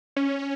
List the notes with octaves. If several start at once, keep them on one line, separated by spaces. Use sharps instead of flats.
C#4